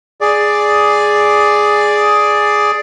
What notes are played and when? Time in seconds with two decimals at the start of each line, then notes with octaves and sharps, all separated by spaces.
0.21 G#4 D5